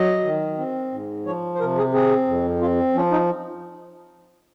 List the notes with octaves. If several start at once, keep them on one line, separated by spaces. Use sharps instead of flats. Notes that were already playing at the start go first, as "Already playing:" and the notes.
Already playing: F#3 D#5
D#3
C4
G#2
F3 C#5
C5
C3 A#4
G#4
C4 G#4
F2
C4 F4
F3 C#4
D#4